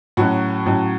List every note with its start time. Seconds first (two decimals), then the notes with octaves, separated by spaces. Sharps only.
0.17 A2 F#3 C#4 F#4
0.66 A2 F#3 C#4